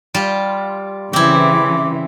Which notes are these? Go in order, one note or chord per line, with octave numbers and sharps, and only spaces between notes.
G3 F4
C#3 E3 C4 E4 D6